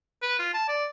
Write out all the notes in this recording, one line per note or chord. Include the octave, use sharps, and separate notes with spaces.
B4
F4
A5
D5